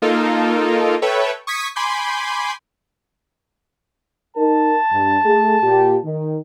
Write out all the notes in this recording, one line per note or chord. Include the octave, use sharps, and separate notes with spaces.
A#3 D#4 F4 A4 A#4
A4 B4 C#5 E5 G5
C#6 D#6 G#6 B6
G#5 B5 C6 D6 G6
D#4 A#4 A5
G2
A3 G#4
A#2 G4
D#3